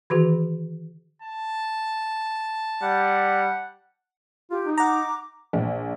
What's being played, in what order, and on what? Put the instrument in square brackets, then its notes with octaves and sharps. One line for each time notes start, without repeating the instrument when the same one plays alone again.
[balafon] D#3 E3 F#4 G#4
[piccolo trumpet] A5
[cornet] G3 [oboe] F#5
[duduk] F4 [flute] G4
[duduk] D#4
[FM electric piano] F#5 A#5 [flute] D6
[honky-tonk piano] A#1